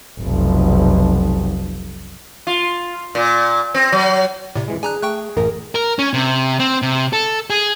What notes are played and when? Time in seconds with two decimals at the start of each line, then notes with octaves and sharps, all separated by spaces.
0.21 F1 B1
2.47 F4
3.15 A#2
3.74 C4
3.92 F#3
4.55 A2 C3 D5
4.68 F2 E3 G#3
4.83 D4 G#4 G#5 A#5 F#6
5.03 A3 G5 C#6 F#6
5.37 A1 F#2 A#4
5.75 A#4
5.99 C#4
6.14 C3
6.59 C4
6.82 C3
7.13 A4
7.50 G#4